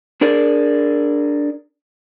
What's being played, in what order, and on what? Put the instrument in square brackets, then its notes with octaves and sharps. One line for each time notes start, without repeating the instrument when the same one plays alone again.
[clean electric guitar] D4 G#4 A#4 D5